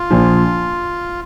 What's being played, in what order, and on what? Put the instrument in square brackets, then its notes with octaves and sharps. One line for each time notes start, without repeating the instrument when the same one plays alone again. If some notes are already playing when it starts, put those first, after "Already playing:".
Already playing: [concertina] F4
[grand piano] A#1 A#2 F3